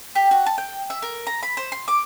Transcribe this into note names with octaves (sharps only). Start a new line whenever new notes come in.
G4
F#4
A5
G5
E5
A#4
A#5
B5
C5
C6
D6